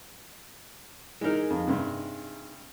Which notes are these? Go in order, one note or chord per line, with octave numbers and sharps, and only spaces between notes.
E3 G#3 D#4 A#4
F2
G2 C3